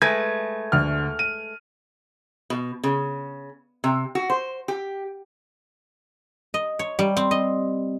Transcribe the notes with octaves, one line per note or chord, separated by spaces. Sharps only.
G#3 A3 B4 G#6
D2 F6
D#7
B2
C#3
C3
F#4
C5
G4
D#5
C#5
G3
C4
D#5